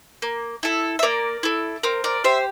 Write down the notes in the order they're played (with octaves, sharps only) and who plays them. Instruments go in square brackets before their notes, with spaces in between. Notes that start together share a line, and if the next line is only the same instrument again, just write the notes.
[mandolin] A#3
E4 A4
E5
A#3 A#4 D5
E4 A4
C4 A#4
A#4 D5
G4 C5 E5